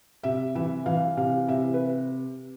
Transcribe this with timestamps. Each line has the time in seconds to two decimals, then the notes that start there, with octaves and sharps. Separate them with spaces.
0.23 C3 E5
0.55 E3 E5
0.86 E3 F5
1.17 C3 F5
1.48 C3 E5
1.74 B4